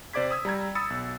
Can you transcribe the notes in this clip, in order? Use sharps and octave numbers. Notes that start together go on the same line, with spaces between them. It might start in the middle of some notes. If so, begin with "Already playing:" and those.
C3 C5 D5 D6 G#6 B6
D#6 E6 G#6
G3 A#5 G#6
B5 D#6 E6 A6 C#7
B1